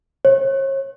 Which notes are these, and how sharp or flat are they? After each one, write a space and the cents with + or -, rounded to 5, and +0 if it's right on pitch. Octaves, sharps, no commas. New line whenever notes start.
C#5 -40